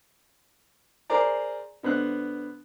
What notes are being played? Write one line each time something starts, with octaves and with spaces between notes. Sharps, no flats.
G#4 A#4 C5 D5 A#5
D3 B3 C5 F#6